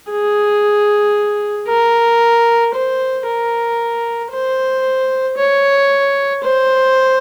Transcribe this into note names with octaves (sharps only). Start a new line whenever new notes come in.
G#4
A#4
C5
A#4
C5
C#5
C5